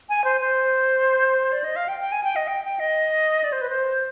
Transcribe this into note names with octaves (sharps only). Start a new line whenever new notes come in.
G#5
C5
C5
D5
D#5
F5
G5
G5
G#5
G5
D#5
G5
G5
D#5
D5
C5
B4
C5